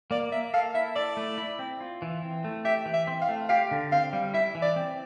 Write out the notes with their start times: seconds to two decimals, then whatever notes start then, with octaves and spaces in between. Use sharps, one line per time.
0.11 A#3 D5
0.32 A#3 E5
0.54 A4 F5
0.75 E4 E5
0.96 A4 D5
1.17 A3
1.38 E4
1.59 C4
1.81 F4
2.02 E3
2.23 C4
2.44 A3
2.65 G4 E5
2.86 E3
2.93 E5
3.07 C4
3.21 F5
3.29 A3
3.49 G4 F5
3.71 D3
3.92 C4 F5
4.13 G3
4.34 E4 E5
4.55 E3
4.62 D5
4.76 C4